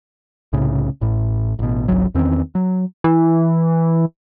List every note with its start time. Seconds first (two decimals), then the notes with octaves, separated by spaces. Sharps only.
0.53 C2 A2 C#3
1.01 A1 A2
1.59 A1 B2
1.88 G#1 C#2 F#3
2.15 E2 D#3 C4 C#4
2.55 F#3
3.04 E3